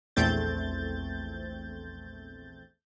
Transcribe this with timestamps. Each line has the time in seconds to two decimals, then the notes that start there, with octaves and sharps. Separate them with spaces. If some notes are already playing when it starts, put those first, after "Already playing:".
0.16 A#1 E2 A3 C4 G6 A6